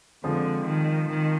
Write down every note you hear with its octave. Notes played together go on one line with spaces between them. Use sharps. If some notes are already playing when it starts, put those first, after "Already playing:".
F2 D3 F3 G#3
D#3
D#3